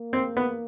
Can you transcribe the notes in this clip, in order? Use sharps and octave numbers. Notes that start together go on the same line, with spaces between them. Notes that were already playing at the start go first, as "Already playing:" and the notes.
Already playing: A#3
C4
B3